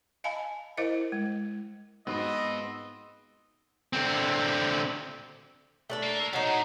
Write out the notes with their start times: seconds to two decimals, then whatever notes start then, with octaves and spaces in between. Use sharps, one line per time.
0.24 D#5 F5 G#5 A5 B5
0.77 E4 A#4 C5 D#5 F5
1.12 G#3
2.07 G#2 F3 B3 C4 F#4 B4 D5 D#5
3.93 D3 C4
5.90 A3 D4 A4
6.03 A#3
6.33 F#3 D#4 C5 F5
6.47 A2